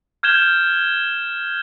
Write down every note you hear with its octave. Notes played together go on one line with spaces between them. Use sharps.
F6 G6 G#6 E7 G7